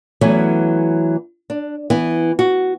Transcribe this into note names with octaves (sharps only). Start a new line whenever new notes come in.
E3 F#3 A3 B3 C#4
D4
E3 B3 E4
F#4